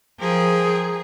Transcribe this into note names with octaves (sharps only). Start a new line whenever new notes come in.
F3 G#4 A#4 G5